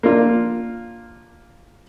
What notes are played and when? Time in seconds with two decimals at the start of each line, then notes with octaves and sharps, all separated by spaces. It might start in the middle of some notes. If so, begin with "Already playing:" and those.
0.03 A#3 D4 F4